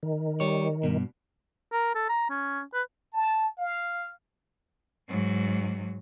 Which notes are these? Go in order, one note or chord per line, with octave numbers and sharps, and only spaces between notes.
D#3
G3 C#5
G2 B2
A#4
A4
A#5
C#4
B4
A5
F5
G#2 F#3